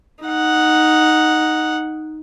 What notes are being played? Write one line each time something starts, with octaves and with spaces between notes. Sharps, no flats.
D#4 F#5